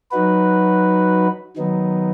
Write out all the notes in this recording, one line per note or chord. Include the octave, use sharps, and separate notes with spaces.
F#3 D#4 F#4 B4
D#3 F#3 B3 D#4